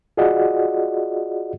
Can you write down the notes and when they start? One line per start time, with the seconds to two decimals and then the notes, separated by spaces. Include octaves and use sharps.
0.17 F4 F#4 G#4 D5 D#5 F#5